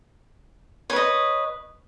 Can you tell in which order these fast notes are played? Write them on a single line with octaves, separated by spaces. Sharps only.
C#5 B4 D#5